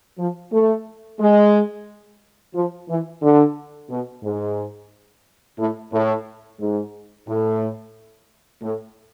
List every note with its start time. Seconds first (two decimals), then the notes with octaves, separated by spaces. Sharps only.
0.18 F3
0.52 A3
1.20 G#3
2.54 F3
2.88 E3
3.22 D3
3.89 B2
4.23 G#2
5.58 A2
5.92 A2
6.59 G#2
7.27 A2
8.62 A2